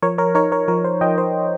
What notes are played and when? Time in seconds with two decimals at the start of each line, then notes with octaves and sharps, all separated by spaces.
0.02 F3 A#4 C#5
0.18 A#4 C#5
0.35 D#4 A#4 C#5
0.52 A#4 C#5
0.68 F3 A#4
0.85 C5
1.01 F3 D#5 G5
1.18 C5